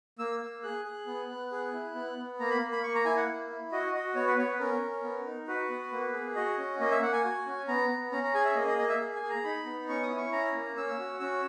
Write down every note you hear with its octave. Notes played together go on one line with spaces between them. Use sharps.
A#3 E6
A#3
G#4 F#6
G#4
B3
B3
G#4
E4
B3
B3
A#3 A#5
B5
A#3
B5
A#3 C#6
A#5
E4 G#5
F#5
A#3
E4
F#4 D#5
F#4 D#5
B3 C#5
B4
B3 C#5
B4
C#4 A#4
C#4
B3
D#4
F#4 B4
B3
A#3
G#4
F#4 D#5
C#4
A#3 D#5
E5
A#3 F#5
G#5
F#4
C#4
B3 A#5
B3
C#4 A#5
A#5
G#4 G#5
E5
A#3 D#5
D#5
A#3 D#5
E5
G#4
G#5
G#4
A#5
D#4 B5
B3
C#4 C#6
D#6
E4
C#6
C#4 A#5
A#3
C#4 E6
F#4
C#4 E6